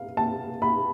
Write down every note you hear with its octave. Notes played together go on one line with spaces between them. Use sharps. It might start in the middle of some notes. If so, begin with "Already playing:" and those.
Already playing: F5
A5
B5